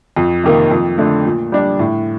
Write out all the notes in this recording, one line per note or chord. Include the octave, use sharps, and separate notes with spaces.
F2
C3 D#3 A#3
F2
D3 A3
A#2
G3 D4
A2